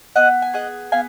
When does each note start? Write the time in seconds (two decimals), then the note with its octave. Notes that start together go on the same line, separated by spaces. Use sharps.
0.16 B3 D#5 F#5
0.42 G#5
0.54 G#4 D#5 F#5
0.92 B3 F5 G#5